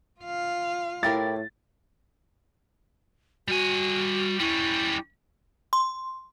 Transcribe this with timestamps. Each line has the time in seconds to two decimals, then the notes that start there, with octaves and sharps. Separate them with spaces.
0.21 F4 F5
1.03 A2 E4 G4 A#4 A6
3.48 G3 F#4 G#5
4.40 G3 C#4 E4
5.73 C6